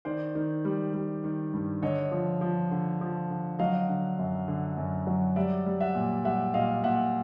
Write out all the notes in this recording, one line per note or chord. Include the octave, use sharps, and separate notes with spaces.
D#3 C5 D5
D#3
G3
G3
D#3
G2
D3 C#5 D#5
F3
F3
D3
F3
D3
F#3 D#5 F5
D3
F#2
D3
F#2
F#3
G3 D5 E5
G3
E5 F#5
A#2
G3 E5 F#5
A#2 D#5 F5
A#2 E5 F#5